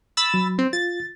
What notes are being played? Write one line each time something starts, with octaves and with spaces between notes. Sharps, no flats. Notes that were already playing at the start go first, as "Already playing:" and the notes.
B5 E6 A6
F#3
C4
F4 A6